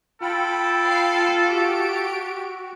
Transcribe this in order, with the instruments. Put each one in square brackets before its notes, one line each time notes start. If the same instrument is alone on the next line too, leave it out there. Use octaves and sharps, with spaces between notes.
[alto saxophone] F4 [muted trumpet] A4 [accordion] G5 B5
[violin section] F5 C7
[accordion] F#4 [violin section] G4 D7